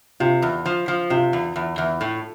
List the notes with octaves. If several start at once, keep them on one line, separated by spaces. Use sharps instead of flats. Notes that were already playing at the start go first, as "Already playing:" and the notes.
C3 F4
E2
F3
F3
C3 F4
E2
E2
E2
A2